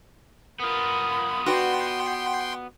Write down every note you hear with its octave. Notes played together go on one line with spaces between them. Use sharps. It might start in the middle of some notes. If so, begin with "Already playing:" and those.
B3 F4 A#4 B5 D#6
F#4 B4 D5 F#5 G5 C6